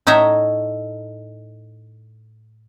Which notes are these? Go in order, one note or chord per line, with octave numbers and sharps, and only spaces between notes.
A2 D#4 C#5 E5 A#5